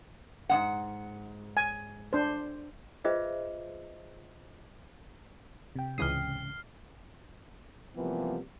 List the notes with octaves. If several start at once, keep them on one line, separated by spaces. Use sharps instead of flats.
G#2 G#3 F#5
G#5
D4 C5
F4 G#4 B4 C5 D#5 E5
C3 G5
C#2 G#2 C#3 E3 D#6 F6 C7
C3 E3 F3 G3 A#3 B3